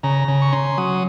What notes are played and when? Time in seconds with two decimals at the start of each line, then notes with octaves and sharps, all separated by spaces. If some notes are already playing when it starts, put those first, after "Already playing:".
0.03 C#3 A#5
0.28 C#3
0.42 C#6
0.53 C#4 C6
0.78 F#3 D#6